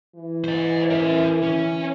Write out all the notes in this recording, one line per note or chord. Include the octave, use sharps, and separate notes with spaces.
E3
C5 D#5
A#4 E5
C#4